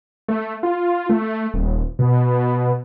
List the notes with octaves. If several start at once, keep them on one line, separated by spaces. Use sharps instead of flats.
A3
F4
A3
D#1
B2